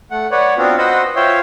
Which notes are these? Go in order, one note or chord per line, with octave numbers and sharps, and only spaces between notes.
A3 F#5
B4 C#5 D5 F#5
B3 C4 D4 F4 F#4
F#4 B4 C5 D#5 F#5 E6
F4 C5 C#5 E5 G5 C6